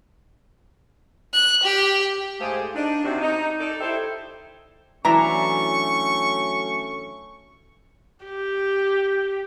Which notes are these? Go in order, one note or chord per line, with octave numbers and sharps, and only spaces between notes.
F#6
G4
G#2 A3 G4 G#4 C5 F5
D4 D#4
C3 F#4
D#4
D#4 A4 D5
E4 G4 A4 C5 E5
E3 F#3 A3 C#4 D4 E5 A#5 C#6
G4